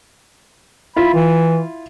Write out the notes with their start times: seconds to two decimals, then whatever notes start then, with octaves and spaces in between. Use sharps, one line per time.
0.96 E4 F4 B5
1.13 E3